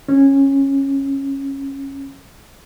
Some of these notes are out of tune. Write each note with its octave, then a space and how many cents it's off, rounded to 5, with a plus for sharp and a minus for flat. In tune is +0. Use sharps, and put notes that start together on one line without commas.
C#4 -15